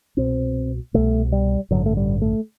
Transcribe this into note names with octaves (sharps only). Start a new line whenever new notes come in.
C2 B2 C4
C2 B2 A3
G3
A1 G2 D3 F#3
A3
G3
A3